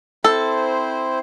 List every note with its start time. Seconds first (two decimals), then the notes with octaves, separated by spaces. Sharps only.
0.24 C4 E4 A4 C5